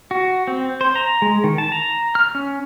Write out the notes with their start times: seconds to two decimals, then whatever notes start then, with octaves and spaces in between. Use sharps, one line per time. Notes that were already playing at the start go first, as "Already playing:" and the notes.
0.11 F#4
0.48 C4
0.81 C5
0.96 A#5
1.22 G#3
1.44 D#3
1.58 A5
1.72 A#5
2.15 F6
2.35 C#4